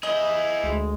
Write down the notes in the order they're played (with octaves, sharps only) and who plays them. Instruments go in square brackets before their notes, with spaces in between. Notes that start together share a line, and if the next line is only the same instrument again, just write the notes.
[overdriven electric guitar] E4 G#4 [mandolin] D#5
[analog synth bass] D2 [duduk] G#3